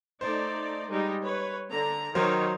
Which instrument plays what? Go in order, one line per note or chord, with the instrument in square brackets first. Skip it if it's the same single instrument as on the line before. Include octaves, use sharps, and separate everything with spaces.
[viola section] A3 D#4 D5 [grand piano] C5
[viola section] G3 G#3 D#4
B4 C#5
D3 A#5
[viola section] D#3 D#4 C#5 [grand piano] F#3 A#4 C5